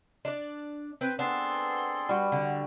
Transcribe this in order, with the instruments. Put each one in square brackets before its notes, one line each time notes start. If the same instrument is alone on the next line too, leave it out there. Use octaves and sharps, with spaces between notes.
[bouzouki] D4 D5
[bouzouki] C4 [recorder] B4
[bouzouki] B3 D4 [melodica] C4 G#4 A4 [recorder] C6
[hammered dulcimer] G3 F#4
[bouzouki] D3